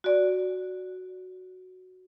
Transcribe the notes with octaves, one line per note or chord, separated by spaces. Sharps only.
F#4 D5